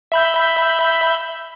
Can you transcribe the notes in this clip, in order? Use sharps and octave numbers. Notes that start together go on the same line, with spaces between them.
E5 B5 G6